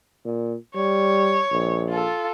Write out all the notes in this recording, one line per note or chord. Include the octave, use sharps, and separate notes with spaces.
A#2
G3 C#5
A#1
F4 A4